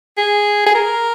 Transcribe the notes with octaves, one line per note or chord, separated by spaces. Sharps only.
G#4
G#4
A#4